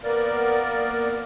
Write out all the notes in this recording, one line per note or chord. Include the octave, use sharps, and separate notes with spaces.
A#3 B3 A#4 D5